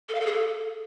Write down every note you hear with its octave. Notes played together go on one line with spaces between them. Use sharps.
A4
F5
A4
G#4
A4